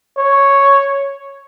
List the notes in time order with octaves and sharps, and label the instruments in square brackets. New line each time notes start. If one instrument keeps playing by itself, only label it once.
[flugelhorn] C#5